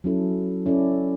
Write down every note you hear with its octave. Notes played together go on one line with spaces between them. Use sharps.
F#3 C#4 E4 A4
C#4 E4 A4 D5